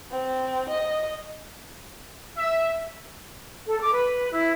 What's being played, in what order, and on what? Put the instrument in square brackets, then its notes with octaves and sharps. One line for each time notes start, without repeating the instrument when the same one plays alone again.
[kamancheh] C4
D#5
[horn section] E5
[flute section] A4
D6
B4
E4